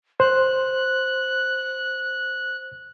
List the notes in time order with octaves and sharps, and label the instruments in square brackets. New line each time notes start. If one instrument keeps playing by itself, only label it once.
[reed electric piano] C5 [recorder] F#6